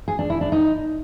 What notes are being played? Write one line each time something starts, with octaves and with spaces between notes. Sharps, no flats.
G#4
D4
E4
D4
D#4